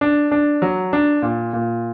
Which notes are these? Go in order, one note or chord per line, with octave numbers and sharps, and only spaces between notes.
D4
D4
F#3
D4
A#2
A#2